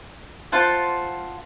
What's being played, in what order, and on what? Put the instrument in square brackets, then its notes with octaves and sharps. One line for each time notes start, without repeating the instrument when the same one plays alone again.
[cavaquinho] F4 C5 F#5 A5